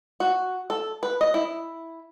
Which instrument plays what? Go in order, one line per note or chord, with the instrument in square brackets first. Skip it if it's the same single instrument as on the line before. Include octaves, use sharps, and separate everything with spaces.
[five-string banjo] F#4
A4
B4
D#5
E4